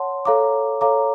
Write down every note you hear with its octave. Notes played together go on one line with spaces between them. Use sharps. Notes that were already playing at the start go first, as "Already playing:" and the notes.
Already playing: C#5 F#5 A5 C6
A4 C#5 F5 A#5 D6
A4 C#5 F5 A#5 D6